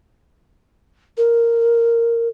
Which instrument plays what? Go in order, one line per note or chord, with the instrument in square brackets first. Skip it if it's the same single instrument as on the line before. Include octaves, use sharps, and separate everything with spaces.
[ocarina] A#4